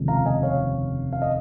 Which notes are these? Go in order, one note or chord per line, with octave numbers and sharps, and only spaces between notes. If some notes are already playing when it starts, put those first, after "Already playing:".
Already playing: F1 D#2 C#3 F3 G#3
F5 A#5
D#5 G#5
C#5 F5
F5
D#5